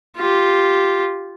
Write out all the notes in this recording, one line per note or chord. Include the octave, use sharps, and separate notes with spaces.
F4 G4